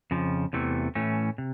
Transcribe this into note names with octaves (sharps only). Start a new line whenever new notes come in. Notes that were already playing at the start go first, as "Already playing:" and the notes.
F2 C#3 F3
E2 C3 E3 A3
A2 E3 A3 C#4
C3